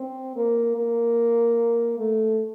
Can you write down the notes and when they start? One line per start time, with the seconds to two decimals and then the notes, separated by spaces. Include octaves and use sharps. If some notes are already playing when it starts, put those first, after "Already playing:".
Already playing: C4
0.36 A#3
0.76 A#3
1.98 A3